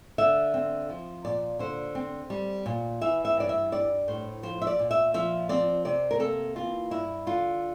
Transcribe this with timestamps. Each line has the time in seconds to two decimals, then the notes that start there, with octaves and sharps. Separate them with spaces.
0.18 D3 E5
0.54 C4
0.89 F3
1.25 A#2 D5
1.59 D3 C5
1.95 C4
2.30 G3
2.66 A#2
3.01 E3 E5
3.25 E5
3.37 G2 D5
3.49 E5
3.72 G3 D5
4.08 A2 C5
4.43 F3 C5
4.62 E5
4.67 D5
4.79 A#2
4.91 E5
5.14 F3 E5
5.49 C4 D5
5.85 C3 D5
6.11 A#4
6.20 A#3 A4
6.56 E3 F4
6.91 G2 E4
7.26 D3 F4